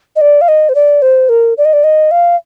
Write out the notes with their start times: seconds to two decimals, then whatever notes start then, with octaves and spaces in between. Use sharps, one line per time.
0.16 D#5
0.21 D5
0.41 F5
0.48 D#5
0.69 C5
0.75 D5
1.02 C5
1.29 A#4
1.58 D5
1.65 D#5
1.73 D5
1.84 D#5
2.11 F5